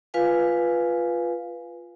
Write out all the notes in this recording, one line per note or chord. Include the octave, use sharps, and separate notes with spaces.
F4 B4 F5 G#5